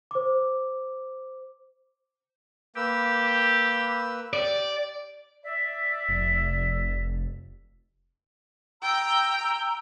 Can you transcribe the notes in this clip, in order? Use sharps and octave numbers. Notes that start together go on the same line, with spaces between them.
C5 D6
A#3 G4 B4 E6
G4 D5
D5 E5
F1
G5 A#5 E6